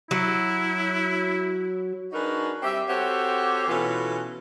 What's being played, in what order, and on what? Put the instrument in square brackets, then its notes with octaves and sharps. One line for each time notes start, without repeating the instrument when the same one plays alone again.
[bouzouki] F#3 [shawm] E4
[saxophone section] D4 D#4 F#4 G#4 A#4 B4
G3 C4 G4 E5
C4 F#4 G4 A4 C5 C#5
B2 E3 B3 C#4 F4 A4